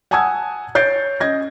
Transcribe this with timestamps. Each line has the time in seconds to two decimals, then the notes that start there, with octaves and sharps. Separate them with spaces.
0.11 F#5 G#5 A5 D#6 E6 G#6
0.75 C#5 G6 A6 C7 D7
1.20 C#4 D#5 G#6 A#6